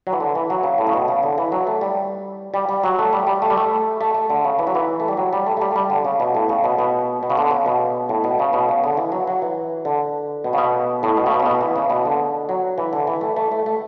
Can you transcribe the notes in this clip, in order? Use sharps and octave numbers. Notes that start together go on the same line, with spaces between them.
F#3
E3
D3
E3
F#3
C#3
A2
C#3
B2
C#3
D3
E3
F#3
A3
G3
G3
G3
F#3
A3
G3
G3
A3
G3
A3
A3
A3
D3
C#3
E3
F#3
E3
A3
G3
F#3
G3
A3
A3
G3
A3
G3
D3
C#3
B2
A2
C#3
B2
B2
B2
C#3
D3
C#3
B2
A2
B2
C#3
B2
C#3
D3
E3
F#3
F#3
E3
D3
B2
C#3
B2
A2
B2
C#3
B2
C#3
B2
E3
C#3
B2
D3
F#3
E3
D3
E3
A3
A3
A3
A3